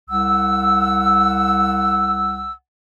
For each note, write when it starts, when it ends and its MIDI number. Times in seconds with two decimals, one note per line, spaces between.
0.10 2.53 36
0.10 2.53 78
0.10 2.53 88